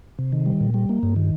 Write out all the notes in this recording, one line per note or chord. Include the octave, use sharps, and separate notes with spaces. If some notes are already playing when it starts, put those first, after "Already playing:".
C3
D#3
G3
A#2
G3
A#3
G2
D#3